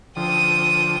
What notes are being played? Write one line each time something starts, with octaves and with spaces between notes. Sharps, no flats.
D3 F3 G5 D#6